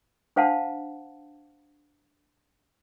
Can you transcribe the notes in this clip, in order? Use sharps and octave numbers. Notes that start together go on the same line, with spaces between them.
D4 C5 F5 F#5 A5